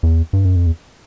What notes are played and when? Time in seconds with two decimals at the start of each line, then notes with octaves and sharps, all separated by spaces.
0.03 E2
0.33 G2
0.45 F#2
0.56 F2
0.66 E2